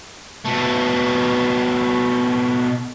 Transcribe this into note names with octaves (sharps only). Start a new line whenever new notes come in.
B2 A3